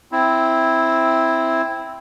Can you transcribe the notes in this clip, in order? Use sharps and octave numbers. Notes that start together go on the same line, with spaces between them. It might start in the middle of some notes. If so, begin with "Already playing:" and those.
C4 E4